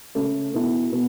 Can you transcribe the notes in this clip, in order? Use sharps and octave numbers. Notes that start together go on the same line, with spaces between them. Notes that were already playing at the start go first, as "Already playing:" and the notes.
C#3 A3 C#4 A4
B2 B3 E4 A4
B2 B3